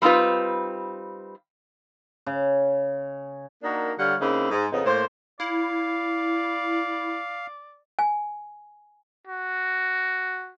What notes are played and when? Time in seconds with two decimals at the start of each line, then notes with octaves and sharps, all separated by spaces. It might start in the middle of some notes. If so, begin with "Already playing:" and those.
0.02 G3 C4 D#4 F4 B4
2.26 C#3
3.63 A#3 D4 D#4 F#4 A#4
3.99 D3 G3 C#5 F5 F#5
4.21 C#3 A#3 C4 D#4 E4
4.51 G#2
4.72 F2 C#3 B3 D#4
4.85 A2 A#3 C5
5.40 E4 D5 F5
7.99 G#5
9.27 F#4